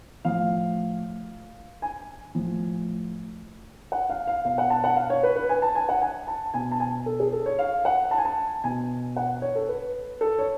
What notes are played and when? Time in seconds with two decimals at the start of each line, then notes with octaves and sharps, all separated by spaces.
0.25 A2 F3 F5
1.82 G#5
2.35 A2 F3
3.92 F#5
4.10 F5
4.27 F5
4.44 B2 F5
4.58 F#5
4.70 A5
4.84 F#5
4.96 F5
5.10 C#5
5.23 B4
5.36 B4
5.49 G#5
5.62 A5
5.75 G#5
5.89 F#5
6.02 G#5
6.28 A5
6.54 B2 G#5
6.71 A5
6.80 G#5
7.06 A4
7.20 G#4
7.33 A4
7.46 C#5
7.59 F5
7.85 F#5
8.11 A5
8.18 G#5
8.25 A5
8.64 B2 G#5
9.16 F#5
9.42 C#5
9.56 A4
9.69 B4
10.21 A4
10.39 C#5